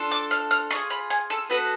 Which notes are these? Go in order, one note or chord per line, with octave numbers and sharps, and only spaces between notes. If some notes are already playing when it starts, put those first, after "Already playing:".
Already playing: D4 F4 A4
D6
F6
F6
D4 F4 G#4 C#6
B5
G#5
A4
B3 F#4 A4 B4